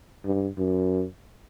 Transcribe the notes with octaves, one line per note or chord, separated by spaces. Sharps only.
G2
F#2